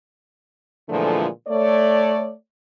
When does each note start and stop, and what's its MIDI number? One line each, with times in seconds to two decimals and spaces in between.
0.89 1.26 46
0.89 1.26 50
0.89 1.26 52
0.89 1.26 53
0.89 1.26 56
0.89 1.26 57
1.47 2.32 57
1.47 2.32 73
1.47 2.32 74